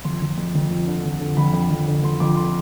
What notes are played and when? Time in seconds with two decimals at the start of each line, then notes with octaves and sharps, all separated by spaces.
0.04 F2 C6
0.22 F2
0.38 F2
0.55 F2
0.70 F3
0.87 D3
1.05 F2
1.20 D3
1.37 F2 B5
1.54 F2
1.71 F2
1.87 D3
2.03 F2 C6
2.20 F2 D6
2.37 C6